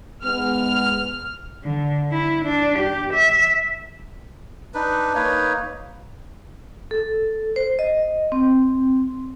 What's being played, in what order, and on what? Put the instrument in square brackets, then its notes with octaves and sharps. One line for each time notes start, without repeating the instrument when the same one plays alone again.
[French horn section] G#2 G#3 B3 [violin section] F6
[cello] D3
E4
D4
G4
E5
[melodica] D4 D#4 B4
A#3 D#4 B4 C#5
[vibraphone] A4
C5
D#5
C4